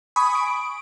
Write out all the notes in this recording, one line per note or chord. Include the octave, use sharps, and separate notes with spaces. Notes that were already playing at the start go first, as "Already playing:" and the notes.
G#5 B5 C#6 D#6
D7